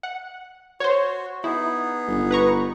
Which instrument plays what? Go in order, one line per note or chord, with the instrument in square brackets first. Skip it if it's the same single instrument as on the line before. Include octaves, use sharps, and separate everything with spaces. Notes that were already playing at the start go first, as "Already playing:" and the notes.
[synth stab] F#5
[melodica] F#4 [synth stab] C5 C#5
[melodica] B3 D#4 G#4 [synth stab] E4
[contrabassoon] G1
[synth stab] B4 A#5 C#6